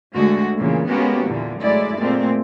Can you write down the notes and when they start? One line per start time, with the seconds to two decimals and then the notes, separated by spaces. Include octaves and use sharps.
0.14 D2 D3 G#3 A3 F#4
0.59 A#2 C#3 E3
0.88 G#3 A#3 B3 C#4 F#4 G4
1.25 E2 A#2 D3 E3
1.60 F#2 A2 G#3 E4 D5
1.97 A#2 G#3 A3 C4